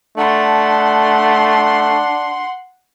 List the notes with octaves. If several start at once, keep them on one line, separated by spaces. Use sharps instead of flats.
A3 D4 F#5 C6